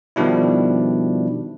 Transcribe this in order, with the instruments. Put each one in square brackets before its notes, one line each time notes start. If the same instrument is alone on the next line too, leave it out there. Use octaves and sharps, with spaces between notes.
[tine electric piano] B2 D#3 F3 G3 D4 E4